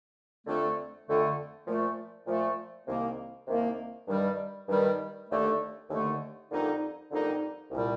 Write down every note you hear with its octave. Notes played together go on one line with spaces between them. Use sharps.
F2 D3 A3
F2 D3 A3
A#2 F3 A3
A#2 F3 A3
C2 C3 D#3 A#3
C2 C3 D#3 A#3
G2 D#3 G3
G2 D#3 G3
D#2 D3 A3
D#2 D3 A3
F2 D3 G3 A#3 D#4
F2 D3 G3 A#3 D#4
C2 A#2 G3